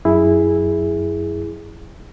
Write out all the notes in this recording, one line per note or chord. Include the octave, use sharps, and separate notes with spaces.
F#2 E4 G#4